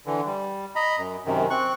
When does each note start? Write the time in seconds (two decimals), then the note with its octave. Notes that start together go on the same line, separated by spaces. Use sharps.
0.06 D3 E3
0.26 G3
0.76 D#5 A#5 B5
0.98 F#2
1.26 F#2 C3 D#3
1.50 C4 C#6 F#6